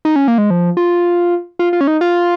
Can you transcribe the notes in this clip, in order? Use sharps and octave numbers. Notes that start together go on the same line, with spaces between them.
D#4
C#4
A#3
G#3
F3
F4
F4
F4
C#4
D#4
F4